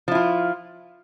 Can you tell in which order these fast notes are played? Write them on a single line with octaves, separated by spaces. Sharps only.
F3 E4 F4